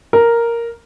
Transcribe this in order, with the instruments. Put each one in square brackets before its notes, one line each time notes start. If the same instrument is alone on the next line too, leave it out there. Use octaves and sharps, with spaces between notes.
[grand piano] A#4